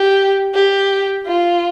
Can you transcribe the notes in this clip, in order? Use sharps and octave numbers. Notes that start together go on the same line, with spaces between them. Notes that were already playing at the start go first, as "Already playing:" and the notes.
Already playing: G4
G4
F4